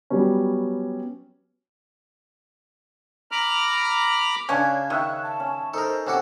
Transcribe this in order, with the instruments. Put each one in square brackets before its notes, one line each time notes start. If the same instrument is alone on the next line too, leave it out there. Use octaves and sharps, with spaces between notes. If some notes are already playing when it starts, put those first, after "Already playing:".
[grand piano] F#3 G3 B3 C#4
[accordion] A#5 B5 D6 F6
[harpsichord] C#3 [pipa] C#4 D4 [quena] G#6
[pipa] D#3 [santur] C#5 E5 C#6 [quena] F#6
[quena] A5
[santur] C#4
[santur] D#4 [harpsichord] A4 A#4 [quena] C5
[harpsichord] C3 F#4 A4 [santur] C#4 [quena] D6